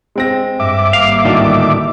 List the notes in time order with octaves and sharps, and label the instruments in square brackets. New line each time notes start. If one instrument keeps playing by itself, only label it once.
[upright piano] G#3 C4 A#6
[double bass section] G2 [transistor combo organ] E5 D6
[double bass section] G#1 G3 A#3 [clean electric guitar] F5
[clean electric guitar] D2 A2 D#3 [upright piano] D#4 F#4 D5